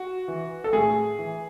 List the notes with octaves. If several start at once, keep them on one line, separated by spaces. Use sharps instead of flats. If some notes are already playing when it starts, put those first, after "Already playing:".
Already playing: F#4
E3
A4
A2 G#4
E3